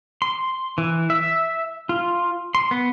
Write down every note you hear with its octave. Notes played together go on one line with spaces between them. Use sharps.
C6
E3
E5
F4
C6
B3